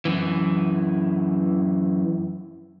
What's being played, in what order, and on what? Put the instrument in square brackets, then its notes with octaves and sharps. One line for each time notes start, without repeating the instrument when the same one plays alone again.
[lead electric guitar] F#2 E3